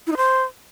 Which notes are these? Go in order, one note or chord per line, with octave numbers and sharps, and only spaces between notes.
E4
D#4
C5